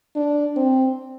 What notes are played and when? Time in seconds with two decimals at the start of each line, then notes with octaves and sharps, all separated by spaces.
0.16 D4
0.56 C4